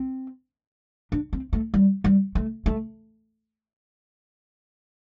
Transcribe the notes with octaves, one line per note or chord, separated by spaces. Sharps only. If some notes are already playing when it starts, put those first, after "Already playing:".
Already playing: C4
D4
C4
A3
G3
G3
A3
A3